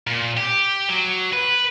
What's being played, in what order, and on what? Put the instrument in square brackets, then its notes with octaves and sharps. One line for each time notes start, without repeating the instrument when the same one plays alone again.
[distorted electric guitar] A#2
G4
F#3
B4